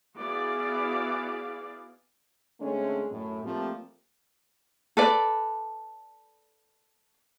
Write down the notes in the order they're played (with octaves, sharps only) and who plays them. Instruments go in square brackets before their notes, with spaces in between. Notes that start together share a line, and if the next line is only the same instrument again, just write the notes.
[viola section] B3 E4 F#4 G#4 D5 F5
[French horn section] D3 G#3 A3 C4 C#4
F#2 A2
F3 G3 A3 A#3 C4 G4
[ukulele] A4 B4 D5